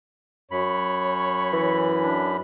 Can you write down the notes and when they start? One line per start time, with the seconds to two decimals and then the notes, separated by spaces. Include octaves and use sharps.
0.51 F#2 C#5 B5
1.53 E3
1.98 D4